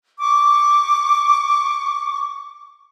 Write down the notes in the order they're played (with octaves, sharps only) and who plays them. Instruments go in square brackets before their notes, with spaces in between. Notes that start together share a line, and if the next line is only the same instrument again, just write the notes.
[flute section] C#6 D6